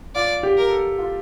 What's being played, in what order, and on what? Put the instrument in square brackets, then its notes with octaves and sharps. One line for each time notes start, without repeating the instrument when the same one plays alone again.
[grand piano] F4 [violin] D5
[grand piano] G4
[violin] A#4
[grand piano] A4
F4